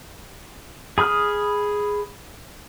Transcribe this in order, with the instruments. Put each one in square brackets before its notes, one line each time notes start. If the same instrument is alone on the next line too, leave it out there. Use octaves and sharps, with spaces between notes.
[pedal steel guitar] G#4 B5 D#6 F6